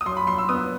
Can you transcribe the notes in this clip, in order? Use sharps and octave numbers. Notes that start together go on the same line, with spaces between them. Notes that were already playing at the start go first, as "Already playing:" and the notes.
D#6
F#2 C6
B5
F#2 C6
E6
B3 D#6